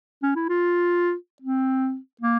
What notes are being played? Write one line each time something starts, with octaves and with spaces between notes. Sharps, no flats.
C#4
E4
F4
C4
A#3